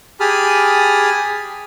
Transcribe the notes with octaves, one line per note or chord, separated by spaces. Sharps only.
G4 G#4 A5 B5 D#6 F6